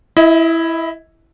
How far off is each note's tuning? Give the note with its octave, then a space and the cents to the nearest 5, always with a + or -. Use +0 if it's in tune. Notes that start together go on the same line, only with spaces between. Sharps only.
E4 +0 D#5 +40